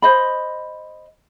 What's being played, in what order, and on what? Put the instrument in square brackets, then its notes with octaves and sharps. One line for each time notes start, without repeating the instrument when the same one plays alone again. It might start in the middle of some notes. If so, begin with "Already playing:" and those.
[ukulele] C5 D#5 B5